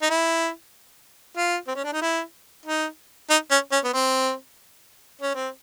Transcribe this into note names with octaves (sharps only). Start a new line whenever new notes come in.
D#4
E4
F4
C4
C#4
D4
D#4
E4
D#4
D#4
C#4
C#4
B3
C4
C#4
C4